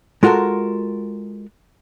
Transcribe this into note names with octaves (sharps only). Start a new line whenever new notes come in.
G#3 F4 F#4 A4 A#4